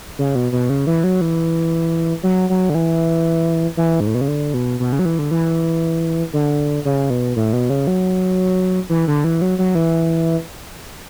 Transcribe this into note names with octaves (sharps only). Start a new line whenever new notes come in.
C#3
B2
B2
C#3
E3
F#3
E3
F#3
F#3
D3
E3
E3
G#2
A2
B2
C#3
D3
B2
B2
C#3
F#3
E3
D3
E3
D3
C#3
B2
A2
B2
C#3
F#3
E3
D3
E3
F#3
F#3
E3